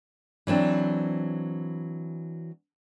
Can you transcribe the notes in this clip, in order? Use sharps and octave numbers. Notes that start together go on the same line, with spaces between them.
E3 F#3 C4 D4